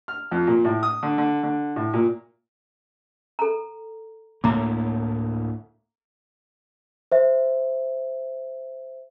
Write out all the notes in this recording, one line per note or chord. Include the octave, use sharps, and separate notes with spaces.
F6
F2
A#2
A2
D#6
D3
D3
D3
A2
A#2
A4 A#5
D2 A2 A#3 A#5 D6
C5 E5